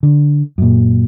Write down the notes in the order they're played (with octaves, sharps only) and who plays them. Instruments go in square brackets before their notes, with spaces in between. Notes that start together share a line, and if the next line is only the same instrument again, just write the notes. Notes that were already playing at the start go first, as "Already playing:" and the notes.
[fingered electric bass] D3
F#2 A#2